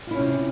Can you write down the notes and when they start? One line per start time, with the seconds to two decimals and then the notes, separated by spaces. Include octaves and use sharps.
0.07 F4
0.11 E4
0.15 C#4
0.18 C3